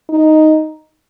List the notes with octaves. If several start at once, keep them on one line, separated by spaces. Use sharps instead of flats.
D#4